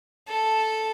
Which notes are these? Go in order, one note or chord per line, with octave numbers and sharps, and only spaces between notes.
A4